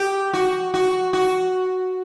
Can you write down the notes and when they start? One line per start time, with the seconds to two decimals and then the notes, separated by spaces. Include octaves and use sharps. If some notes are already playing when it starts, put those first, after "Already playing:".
Already playing: G4
0.33 F#4
0.74 F#4
1.13 F#4